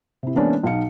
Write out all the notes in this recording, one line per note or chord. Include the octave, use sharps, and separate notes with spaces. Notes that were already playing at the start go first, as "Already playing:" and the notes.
C3 E4
E3 G#3 A#3 B3 C#4 D4
B1 D#4 F5 C#7